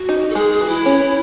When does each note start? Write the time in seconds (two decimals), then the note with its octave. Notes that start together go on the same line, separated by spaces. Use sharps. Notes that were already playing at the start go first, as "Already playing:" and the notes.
Already playing: F#4
0.09 D#4
0.30 A4
0.35 G#3 G#4
0.52 G#4
0.61 E3 F#4
0.68 E4
0.86 C#4